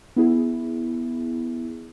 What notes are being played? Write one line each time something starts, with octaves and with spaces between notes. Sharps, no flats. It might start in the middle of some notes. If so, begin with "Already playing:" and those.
B3 E4 G#4